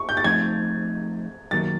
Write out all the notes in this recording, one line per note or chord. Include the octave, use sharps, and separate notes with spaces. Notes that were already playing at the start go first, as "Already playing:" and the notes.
Already playing: C#6
G6
A6
F3 A3 C4 D#4 G#6
F#2 D#3 F#3 A#3 A6